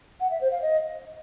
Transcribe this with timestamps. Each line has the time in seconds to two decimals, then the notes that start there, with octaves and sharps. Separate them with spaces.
0.20 F#5
0.31 E5
0.41 C5
0.52 F5
0.62 D#5